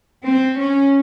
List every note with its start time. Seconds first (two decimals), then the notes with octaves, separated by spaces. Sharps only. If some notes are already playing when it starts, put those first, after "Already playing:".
0.25 C4
0.58 C#4